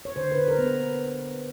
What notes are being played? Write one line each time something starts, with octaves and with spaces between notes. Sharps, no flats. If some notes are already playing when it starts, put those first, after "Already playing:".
C#5
D3 C5
B4
D3
A#4
B3